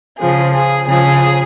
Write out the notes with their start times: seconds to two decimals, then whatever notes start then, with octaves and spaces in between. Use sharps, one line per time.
0.19 C#3 F3 G#4
0.53 G#4
0.87 C#3 F3 G#4